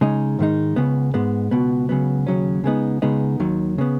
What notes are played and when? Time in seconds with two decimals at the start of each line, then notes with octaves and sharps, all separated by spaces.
0.01 C#3 G#3 D#4
0.39 G#2 D#3 G#3 D#4
0.76 C#2 C#3 B3
1.14 G#2 G#3 B3
1.51 C#2 B2 B3
1.89 C#2 C#3 F#3 B3
2.27 D#2 C#3 F#3 C#4
2.64 C#3 G#3 B3 D#4
3.02 C#2 C#3 G#3 B3 D#4
3.40 D#2 D#3 F#3
3.78 C#3 B3